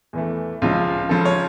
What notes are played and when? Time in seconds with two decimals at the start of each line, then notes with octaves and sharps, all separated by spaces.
0.13 E2 E3 A3
0.62 C#2 C#3 F3 F4
1.09 C#2 C#3 F3 A4
1.25 C#5